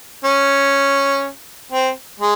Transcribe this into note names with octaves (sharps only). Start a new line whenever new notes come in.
C#4
C4
G#3